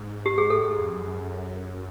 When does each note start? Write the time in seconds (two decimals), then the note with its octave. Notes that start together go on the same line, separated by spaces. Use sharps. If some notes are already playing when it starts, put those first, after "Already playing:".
Already playing: G#2
0.26 G4
0.38 G#4
0.50 A2 A4
0.65 G#2
0.79 F2
0.93 F#2